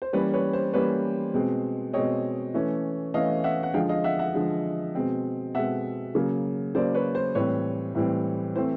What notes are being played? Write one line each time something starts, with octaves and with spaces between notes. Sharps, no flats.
C5
E3 G3 A#3 C#4 B4 C#5
B4 C#5
C5
E3 G3 A#3 C#4 B4 C#5
B2 G#3 C4
B2 G#3 C4 C#5 D#5
E3 A3 C#4
E3 A3 C#4 D#5 F5
E5 F#5
F#5
D3 F3 G#3 F5 G5
D#5 F5
E5 F#5
E5 F#5
D3 F3 G#3
B2 G#3 C4
B2 G#3 C4 E5 F#5
C#3 F#3 A#3
C#3 F#3 A#3 C5 D5
B4 C#5
C5
A2 E3 G3 C4 B4 C#5
A2 E3 G3 C4
E3 A3 C4 C5